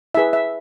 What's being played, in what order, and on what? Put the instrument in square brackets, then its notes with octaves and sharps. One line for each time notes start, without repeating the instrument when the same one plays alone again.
[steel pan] E4 G#4 B4 E5
E5